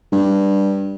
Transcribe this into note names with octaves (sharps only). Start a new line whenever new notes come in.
G2